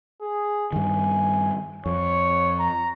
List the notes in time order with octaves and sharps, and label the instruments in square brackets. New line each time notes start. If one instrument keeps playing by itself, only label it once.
[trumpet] G#4
[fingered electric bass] G2 D#3 [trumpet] G#5
[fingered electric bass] F2 [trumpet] C#5
[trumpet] A#5